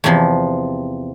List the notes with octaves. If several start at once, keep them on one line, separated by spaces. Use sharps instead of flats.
E2 C3 F3